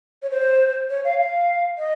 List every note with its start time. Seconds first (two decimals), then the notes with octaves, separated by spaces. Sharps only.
0.22 C#5
0.31 C5
0.90 C#5
1.05 F5
1.20 F5
1.78 D#5